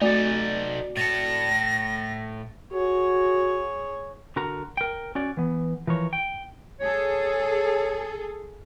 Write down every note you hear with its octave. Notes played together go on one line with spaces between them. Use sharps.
A3 C4 D#4 F#4 A4 D5
A2 A5 A6 A#6 C#7
F#4 G#4 C#5
D3 F#4 A#4 A#5
A#4 G5
C#4 F#4 D5
E3 B3
E3 F3 A#4 C#5
G5
G#4 A4 C#5